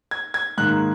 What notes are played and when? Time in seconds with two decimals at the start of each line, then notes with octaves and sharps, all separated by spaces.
0.11 G#6
0.34 G#6
0.58 G#2 D#3 A#3 F#6